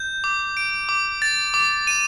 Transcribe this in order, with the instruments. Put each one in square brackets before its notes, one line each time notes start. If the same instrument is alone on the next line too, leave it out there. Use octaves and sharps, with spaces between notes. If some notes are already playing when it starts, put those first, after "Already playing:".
Already playing: [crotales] G6
D6
D7
D6
A6
D6
D#7